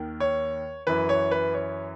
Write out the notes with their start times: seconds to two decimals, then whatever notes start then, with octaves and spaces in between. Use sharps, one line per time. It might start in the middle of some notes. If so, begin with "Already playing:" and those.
Already playing: D#2 D#3
0.20 C#5
0.87 F#2 E3 B4
1.09 C#5
1.31 B4
1.54 C#5